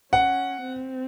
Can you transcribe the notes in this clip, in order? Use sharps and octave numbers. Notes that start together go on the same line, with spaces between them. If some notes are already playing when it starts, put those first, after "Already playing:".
C#4 F#5
C4